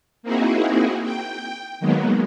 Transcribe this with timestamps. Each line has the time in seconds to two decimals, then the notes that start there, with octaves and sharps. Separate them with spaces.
0.23 A#3 C4 D#4 E4 F#4 G#4
1.03 G5
1.80 D#3 F#3 G#3 A#3 B3